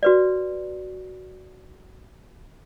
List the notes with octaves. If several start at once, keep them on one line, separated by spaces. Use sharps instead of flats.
F#4 B4 D5